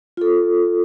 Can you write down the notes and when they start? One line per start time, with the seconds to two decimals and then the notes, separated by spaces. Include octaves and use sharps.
0.17 F4 A4